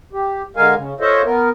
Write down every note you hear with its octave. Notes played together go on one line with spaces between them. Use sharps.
G4
D3 G#3 A#4 F5 G#5
C#3
F4 A4 C5 C#5 D#5 E5
B3 A#4